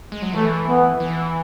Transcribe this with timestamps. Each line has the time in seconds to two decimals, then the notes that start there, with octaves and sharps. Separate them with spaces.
0.12 G#3
0.22 F#3
0.33 E3 A3
0.67 B3
1.00 E3